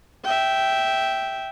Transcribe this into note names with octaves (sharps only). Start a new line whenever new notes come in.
E5 G5